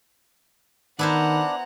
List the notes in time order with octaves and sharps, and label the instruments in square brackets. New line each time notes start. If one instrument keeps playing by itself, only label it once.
[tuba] D#3 [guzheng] B3 E4 C5 [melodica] D4 [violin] F#5 A#5